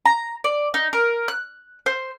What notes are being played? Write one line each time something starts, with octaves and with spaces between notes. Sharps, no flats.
A#5
D5
D#4
A#4
F#6
C5